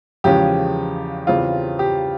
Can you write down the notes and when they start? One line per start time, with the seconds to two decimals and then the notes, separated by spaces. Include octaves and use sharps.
0.24 E2 C#3 F3 G#3 C#4 G4
1.27 E2 C#3 G3 C4 F4
1.79 G4